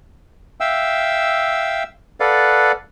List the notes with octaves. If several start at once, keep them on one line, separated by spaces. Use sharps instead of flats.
E5 F5 G5 E6
A4 B4 D5 F5 F#5